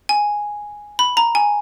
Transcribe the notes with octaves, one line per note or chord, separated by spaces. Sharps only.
G#5
B5
A#5
G#5